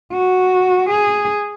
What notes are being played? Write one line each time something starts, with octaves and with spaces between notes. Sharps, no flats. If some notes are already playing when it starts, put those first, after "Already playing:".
F#4
G#4